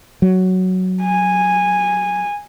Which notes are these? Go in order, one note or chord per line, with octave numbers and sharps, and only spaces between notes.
F#3
G#5